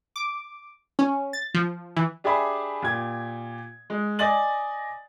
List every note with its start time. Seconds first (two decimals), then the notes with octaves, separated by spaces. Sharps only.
0.16 D6
0.99 C#4
1.33 A6
1.54 F3
1.96 E3
2.24 D4 G4 G#4 E5 G#5 B5
2.82 A#2 G4 G#6
3.90 G#3
4.19 D5 D#5 G#5 A6 F#7